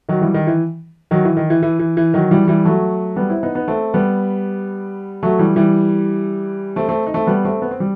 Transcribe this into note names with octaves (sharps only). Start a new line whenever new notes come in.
D#3 F#3
E3 G3
D#3
E3
D#3 F#3
E3
D#3
E3
E3
E3
E3
D#3 F#3
E3 G3
E3 G3
F#3 A3
G3 B3
C4 E4
B3 D#4
B3 D#4
A3 C4
G3 B3
F#3 A3
E3 G3
E3 G3
A3 C4
A3 C4
D#4
A3 C4
G3 B3
A3 C4
B3
C4
G3